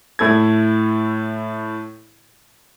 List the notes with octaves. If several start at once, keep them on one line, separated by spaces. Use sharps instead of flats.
A2 E4 A4 G#6